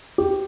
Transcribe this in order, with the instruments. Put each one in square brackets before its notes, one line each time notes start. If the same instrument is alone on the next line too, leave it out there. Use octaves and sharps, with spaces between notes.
[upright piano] G4